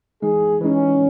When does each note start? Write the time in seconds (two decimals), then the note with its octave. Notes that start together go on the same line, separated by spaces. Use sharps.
0.22 E3 G#3 D#4 G#4
0.61 E3 G#3 C#4 D#4